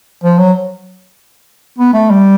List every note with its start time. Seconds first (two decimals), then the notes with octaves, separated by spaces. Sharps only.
0.24 F3
0.38 F#3
1.78 B3
1.93 A3
2.10 G3